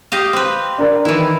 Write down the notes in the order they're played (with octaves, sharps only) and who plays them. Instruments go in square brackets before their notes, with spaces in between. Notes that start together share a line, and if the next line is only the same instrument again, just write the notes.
[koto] G4 D#5 F5
C4 B4
[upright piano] D4 A#4 D5
[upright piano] D#3 [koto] E3 E4